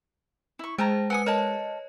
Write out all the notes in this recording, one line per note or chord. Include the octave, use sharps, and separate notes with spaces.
E4 C#6
G#3 C5 G5 A5 A#5
B4 F#5 G#5 D#6 C#7
A#4 C#5 D#5 A5